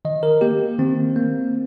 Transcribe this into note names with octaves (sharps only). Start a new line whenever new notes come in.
D#3 D#5
A#4
A#3 G4
D#3 C4
A#3